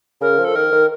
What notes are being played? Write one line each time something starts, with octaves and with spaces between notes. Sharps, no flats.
C#3 A#4
F3
A4
D#3 A#4
D#3